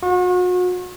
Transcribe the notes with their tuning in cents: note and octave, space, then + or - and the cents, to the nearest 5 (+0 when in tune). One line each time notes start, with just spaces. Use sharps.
F#4 -40